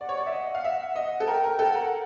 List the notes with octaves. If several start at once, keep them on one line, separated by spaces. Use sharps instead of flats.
D5 F#5
C#5
D5
E5
D#5
F5
E5
D#5
A4
A#4 G5
A#4
G5
A4
F#5
A#4